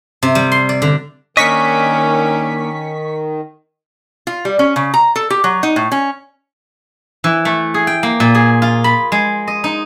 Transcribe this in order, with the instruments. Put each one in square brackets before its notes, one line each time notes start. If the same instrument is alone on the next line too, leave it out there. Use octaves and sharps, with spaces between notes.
[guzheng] C3
G3
C6
D5
D3
[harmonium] D#3 [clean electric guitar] A#3 D4 D#5 [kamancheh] C#4 [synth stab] C#6 B6
[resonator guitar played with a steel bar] F4
G3
C#4
C#3
A#5
A4
G4
F#3
D#4
A2
C#4
[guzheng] E3
A3
G#4
G5
A#3
A#2
G#4
F4
B5
G#3
D#5
D#4